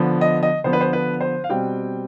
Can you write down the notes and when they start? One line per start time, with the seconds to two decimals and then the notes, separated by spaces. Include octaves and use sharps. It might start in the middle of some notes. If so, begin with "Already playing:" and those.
Already playing: D3 F3 B3
0.21 D#5
0.43 D#5
0.64 D3 F3 B3 C5
0.73 B4
0.81 C5
0.93 B4
1.21 C5
1.44 F5
1.49 B2 G3 C4 G5